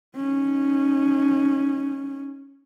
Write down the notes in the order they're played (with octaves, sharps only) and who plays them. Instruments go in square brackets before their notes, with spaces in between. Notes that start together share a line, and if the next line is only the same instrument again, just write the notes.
[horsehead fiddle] C#4 D#4